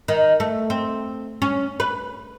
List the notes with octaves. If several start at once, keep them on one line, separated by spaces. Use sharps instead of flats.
D#3
A3
C4
C#4
B4